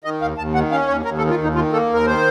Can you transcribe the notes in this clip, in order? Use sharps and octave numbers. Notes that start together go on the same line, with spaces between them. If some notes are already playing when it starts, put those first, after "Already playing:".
D#3 D#5
D#2 F5
D#2 A5
D#3 F#5
C#4 F5
D#2 C#5
D#2 A#4
A4
D#3
F4
D#2
D#4
D#3 F4
A#3 A4
D#2 A#4
D#3 C5